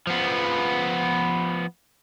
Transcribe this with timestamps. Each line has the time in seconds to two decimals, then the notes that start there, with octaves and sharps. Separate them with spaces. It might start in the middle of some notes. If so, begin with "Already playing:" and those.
0.07 F3 B3